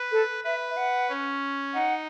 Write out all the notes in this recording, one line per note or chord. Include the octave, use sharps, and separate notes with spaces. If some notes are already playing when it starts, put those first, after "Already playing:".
Already playing: B4
A4
B4 E5
E5
F#5
C#4
D#4 F#5